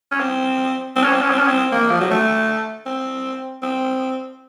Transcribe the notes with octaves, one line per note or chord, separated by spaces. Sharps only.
C#4
C4
C4
C#4
C4
C#4
C4
C#4
C4
A#3
F3
F#3
A3
C4
C4